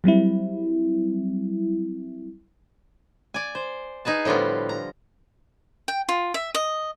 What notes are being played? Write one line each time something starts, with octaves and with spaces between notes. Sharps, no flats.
F#3 G3 C4 E4
D5 G#5
C5
D#4 G#4 B4 A5
A2 D3 F3 G3 B3
A#5
G5
F4
E5
D#5